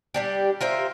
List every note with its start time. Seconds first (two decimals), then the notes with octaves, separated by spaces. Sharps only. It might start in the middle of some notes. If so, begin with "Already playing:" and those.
0.14 G3 D4 G4
0.61 F4 A#4 C5 E5